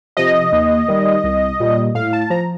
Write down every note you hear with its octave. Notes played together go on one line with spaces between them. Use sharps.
C3 F3 D#5
D#2
D#3 G3
C2
A#2 G3
A2 F5
A5
F3 A#5